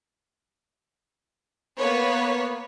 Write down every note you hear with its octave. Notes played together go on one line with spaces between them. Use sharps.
A#3 B3 B4 C#5